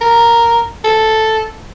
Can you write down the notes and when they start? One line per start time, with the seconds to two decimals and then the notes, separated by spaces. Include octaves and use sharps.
0.01 A#4
0.84 A4